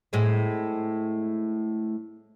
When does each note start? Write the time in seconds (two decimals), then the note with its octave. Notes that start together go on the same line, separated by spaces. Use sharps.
0.13 A2 G#3 C4